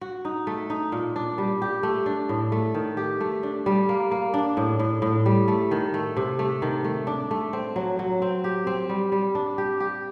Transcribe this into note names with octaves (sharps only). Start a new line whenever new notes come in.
F#4
D#4
A3
D#4
A#2
D4
G3
G4
A3
D4
A2
A3
D#3
G4
A3
D4
G3
A#3
A#3
D4
A2
A2
A2
G3
A3
D#3
A3
C3
A3
D#3
A3
D4
A3
C4
F#3
F#3
C4
G4
C4
G3
G3
D4
G4
G4